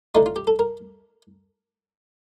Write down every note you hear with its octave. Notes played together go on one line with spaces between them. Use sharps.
D3 A3 D#4 F4
F4
G4
A4
A#4